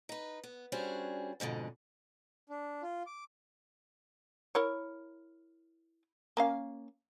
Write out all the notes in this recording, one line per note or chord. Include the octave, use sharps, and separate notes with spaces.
D#4 B4
B3
G3 C#4 D4 F#4 G#4 C5
F2 G#2 B2 D3
D4
F4
D6
E4 A#4 C#5
A#3 C#4 F5